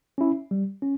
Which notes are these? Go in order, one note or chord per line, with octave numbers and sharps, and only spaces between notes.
C#4 E4
G3
C#4